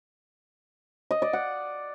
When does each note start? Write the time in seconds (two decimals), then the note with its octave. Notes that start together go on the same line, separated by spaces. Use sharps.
1.11 D#5
1.22 D5
1.33 F#5